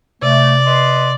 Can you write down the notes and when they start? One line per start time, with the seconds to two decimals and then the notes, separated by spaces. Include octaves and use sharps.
0.22 C3 A3 D5
0.66 B4 D#5 C6